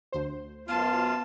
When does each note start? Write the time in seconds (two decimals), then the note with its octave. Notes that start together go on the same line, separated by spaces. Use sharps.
0.12 D2 C5
0.68 F#2 B3 F4 F5 A5